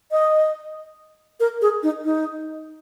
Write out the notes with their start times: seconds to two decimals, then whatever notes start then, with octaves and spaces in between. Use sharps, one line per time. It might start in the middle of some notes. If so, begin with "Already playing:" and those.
0.11 D#5
1.40 A#4
1.62 G#4
1.83 D#4
2.05 D#4